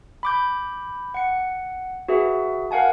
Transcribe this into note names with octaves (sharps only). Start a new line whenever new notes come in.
B5 D6 G6
F#5 C#7
F#4 G#4 B4 E5
A#4 F5 F#5 G#5 A5